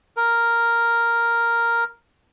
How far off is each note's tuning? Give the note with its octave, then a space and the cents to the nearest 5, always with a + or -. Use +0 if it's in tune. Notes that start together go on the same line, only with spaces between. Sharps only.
A#4 +0